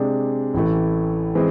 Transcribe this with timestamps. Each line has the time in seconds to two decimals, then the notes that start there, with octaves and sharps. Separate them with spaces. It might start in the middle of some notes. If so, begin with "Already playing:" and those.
Already playing: C3 G#3 D4
0.54 A1 A2 E3 A3
1.35 E3 G#3 C4